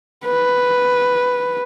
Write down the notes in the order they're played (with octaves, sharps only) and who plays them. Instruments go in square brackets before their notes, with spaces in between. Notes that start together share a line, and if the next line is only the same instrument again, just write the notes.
[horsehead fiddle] B4